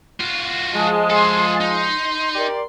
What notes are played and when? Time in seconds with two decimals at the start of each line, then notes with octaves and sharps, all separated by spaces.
0.20 F4 F#4
0.74 F3 G#3 A5
1.10 G#4 A4 C6
1.61 D#4 C6
2.35 G4 A#4 D5